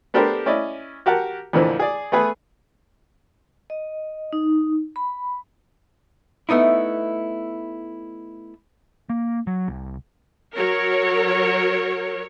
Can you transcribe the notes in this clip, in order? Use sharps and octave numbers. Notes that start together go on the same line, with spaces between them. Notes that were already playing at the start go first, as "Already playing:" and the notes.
B3 D4 G4 A4 A#4 C5
C#4 E4 D5 D#5
F#4 G4 A#4 F#5 A5
F2 A#2 D3 E3 F3
G#4 D5
A3 B3 G#4 B4
D#5
D#4
B5
A3 B3 D#4 E4
A#3
F#3
C2
F#3 A#4 C#5